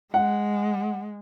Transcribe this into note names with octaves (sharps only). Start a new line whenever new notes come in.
G#3 F#5